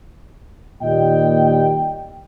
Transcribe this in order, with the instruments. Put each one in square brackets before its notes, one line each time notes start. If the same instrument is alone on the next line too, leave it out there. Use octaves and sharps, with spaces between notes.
[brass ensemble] D#2 A#2 G3 D#5 G5